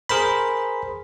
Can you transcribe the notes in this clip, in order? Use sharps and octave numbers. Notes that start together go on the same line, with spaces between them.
G#4 A#4 C5 B5